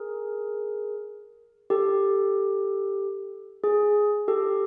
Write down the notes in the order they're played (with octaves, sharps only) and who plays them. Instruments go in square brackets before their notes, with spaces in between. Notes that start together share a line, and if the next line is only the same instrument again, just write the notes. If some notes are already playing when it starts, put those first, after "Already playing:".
Already playing: [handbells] G#4 A#4
G4 A4
G#4
G4 A4